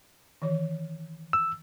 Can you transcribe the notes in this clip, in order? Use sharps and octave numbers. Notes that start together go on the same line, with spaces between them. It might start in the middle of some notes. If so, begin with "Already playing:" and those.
D#3 E3 C#5
E6